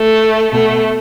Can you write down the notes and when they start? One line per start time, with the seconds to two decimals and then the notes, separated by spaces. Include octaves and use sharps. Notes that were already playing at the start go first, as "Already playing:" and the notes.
Already playing: A3
0.52 B2 A3